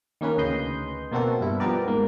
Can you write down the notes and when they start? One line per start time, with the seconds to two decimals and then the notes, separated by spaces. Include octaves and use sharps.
0.21 D#3 A#3 C#4 B4
0.38 D2 C#3 B4 D#5 C6 G6
1.12 B2 A#3 C4 F#4 A4
1.41 G2 E4
1.60 F3 G3 B3 G4 A#4 D5
1.85 G#2 A#3